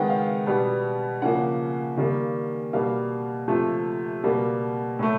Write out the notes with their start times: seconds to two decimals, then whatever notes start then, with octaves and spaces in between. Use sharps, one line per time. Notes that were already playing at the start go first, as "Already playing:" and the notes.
Already playing: D#3 G#3 B3 F#5 G5
0.09 F5
0.46 B2 G3 B3
1.22 C#3 F3 A#3 F#5
1.97 D#3 G3 A#3
2.73 B2 G3 A#3 F5
3.48 C3 F3 A3
4.24 B2 G3 A#3
4.99 A2 F#3 A3